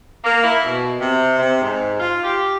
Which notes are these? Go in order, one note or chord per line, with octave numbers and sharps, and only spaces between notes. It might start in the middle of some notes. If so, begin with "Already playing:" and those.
A#3
E4
B2
C3
C3
G#2
F4
G4